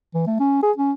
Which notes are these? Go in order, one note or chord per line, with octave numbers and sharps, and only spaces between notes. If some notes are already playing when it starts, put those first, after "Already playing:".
E3
A3
C#4
G#4
C#4